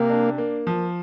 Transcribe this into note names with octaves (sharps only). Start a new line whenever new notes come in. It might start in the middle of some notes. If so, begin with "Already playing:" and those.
Already playing: C3 A#3
D4
A#3
F3